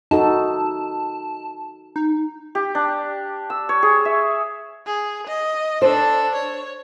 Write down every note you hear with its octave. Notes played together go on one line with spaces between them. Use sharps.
D#4 F#4 A4 A5
D#4
G4
D4
E6
C#5
G#4
E5
G#4
D#5
D4 A4 C5
C#5